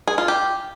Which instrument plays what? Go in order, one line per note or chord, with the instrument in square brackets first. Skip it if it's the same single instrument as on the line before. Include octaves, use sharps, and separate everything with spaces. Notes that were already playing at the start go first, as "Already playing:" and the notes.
[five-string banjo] G#4
F4
G4